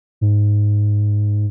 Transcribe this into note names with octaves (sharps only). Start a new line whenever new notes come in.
G#2